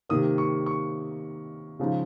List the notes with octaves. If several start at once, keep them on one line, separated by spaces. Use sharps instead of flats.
C3 D#3 A#3 D#6
C#6
C#6
C#3 F3 G#3 D#4